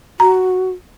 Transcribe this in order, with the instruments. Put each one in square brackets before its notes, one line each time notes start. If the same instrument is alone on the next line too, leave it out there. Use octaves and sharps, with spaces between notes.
[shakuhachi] F#4 [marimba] A#5